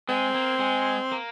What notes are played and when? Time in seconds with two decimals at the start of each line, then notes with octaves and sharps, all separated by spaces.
0.09 G#3 C4
0.34 A#3
0.59 G#3
1.12 A#3